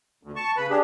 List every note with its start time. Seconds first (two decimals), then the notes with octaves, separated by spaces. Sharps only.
0.23 D2
0.36 A5 C#6
0.57 C#3 B4 B5
0.70 D4 G4 G#4